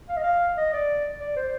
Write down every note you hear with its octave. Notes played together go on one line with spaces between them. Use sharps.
F5
D#5
F5
D#5
D5
D5
C5